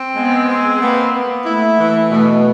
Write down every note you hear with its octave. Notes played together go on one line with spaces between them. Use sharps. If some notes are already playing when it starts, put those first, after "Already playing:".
Already playing: C4
G#3 B3
C4
A#3 B3
B3
A3 E4
E3
B2 A3